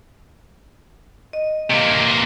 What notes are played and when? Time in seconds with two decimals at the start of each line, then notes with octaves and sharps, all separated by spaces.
1.33 D#5
1.70 C3 A#3